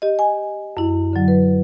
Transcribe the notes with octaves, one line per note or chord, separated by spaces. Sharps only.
G4 D#5
G#5
F#2 E4
D3 F#3
B4